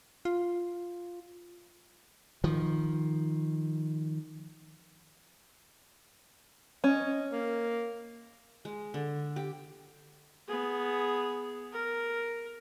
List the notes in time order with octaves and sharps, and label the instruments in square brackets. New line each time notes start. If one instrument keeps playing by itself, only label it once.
[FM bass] F4
[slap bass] D#3 F3
[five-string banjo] C#4 [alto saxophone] D#5
[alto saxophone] A#3
[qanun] G#3
D3
G4
[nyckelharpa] B3 G#4
A#4